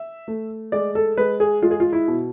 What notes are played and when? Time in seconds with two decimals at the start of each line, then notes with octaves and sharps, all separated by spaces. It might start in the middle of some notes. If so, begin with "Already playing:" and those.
Already playing: E5
0.28 A3
0.72 G#3 D5
0.95 A4
1.17 G#3 B4
1.40 G#4
1.62 G#3 F4
1.71 G#4
1.80 F4
1.93 E4
2.08 B2